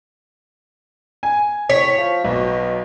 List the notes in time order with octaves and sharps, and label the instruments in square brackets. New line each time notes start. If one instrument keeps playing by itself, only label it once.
[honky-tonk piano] G#5
[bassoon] A2 [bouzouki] C#5 [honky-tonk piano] B6
[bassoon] F3
[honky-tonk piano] B1 [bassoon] B2